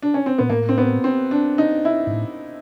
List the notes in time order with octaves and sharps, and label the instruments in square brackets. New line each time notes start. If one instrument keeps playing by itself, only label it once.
[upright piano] D4
C#4
C4
[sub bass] A#2 [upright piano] B3
[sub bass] A2 [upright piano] A#3
[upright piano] C4
B3
C4
D4
D#4
E4
[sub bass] G#2
A2